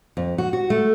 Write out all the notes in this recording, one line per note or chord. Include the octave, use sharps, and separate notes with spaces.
F2
F#4
F#4
A3